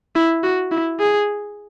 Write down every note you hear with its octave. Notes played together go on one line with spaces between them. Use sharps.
E4
F#4
E4
G#4